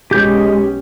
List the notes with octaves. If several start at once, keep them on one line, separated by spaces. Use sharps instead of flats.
B1 G#3 C#4 G4 G6